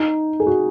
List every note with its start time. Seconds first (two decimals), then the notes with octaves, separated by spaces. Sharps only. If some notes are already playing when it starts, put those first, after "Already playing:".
Already playing: D#4
0.40 G#4
0.47 F#4